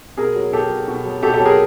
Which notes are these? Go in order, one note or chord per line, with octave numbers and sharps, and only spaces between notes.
B2 G#4 A#4
F#3
B2 G4 A4
F#3
B2
F#3
B2 G4 A4
G4 A4
F#3
G#4 A#4